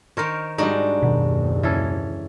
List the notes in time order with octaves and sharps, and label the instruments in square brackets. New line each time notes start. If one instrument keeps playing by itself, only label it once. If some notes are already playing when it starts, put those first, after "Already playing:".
[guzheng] D#3 C#5 [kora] A#4 C5
[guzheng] G#2 D4 F#4 [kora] G3 D#4
[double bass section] F#1 D#2 [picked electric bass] B2 D#3
[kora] E3 C#4 A4